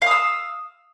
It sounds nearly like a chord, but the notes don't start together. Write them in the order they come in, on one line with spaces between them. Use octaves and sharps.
F5 D#6 E6